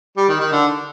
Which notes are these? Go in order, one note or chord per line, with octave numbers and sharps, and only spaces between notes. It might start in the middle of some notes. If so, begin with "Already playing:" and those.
G3
D#3
D#3
D3